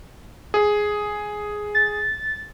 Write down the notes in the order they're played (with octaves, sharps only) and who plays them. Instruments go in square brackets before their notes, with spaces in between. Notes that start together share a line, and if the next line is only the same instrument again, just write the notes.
[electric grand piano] G#4
[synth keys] A6